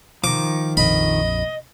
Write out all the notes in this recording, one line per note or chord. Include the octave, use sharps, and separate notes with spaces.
D#3 F3 D6
A#1 F2 D#5 B5